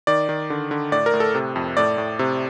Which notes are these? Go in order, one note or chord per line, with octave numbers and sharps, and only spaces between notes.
D#3 D5
D#3
D3
D3
A2 D5
A#4
A2
A4
C3
F2
A2 D5
A2
C3